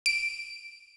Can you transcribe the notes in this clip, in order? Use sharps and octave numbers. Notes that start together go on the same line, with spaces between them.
D7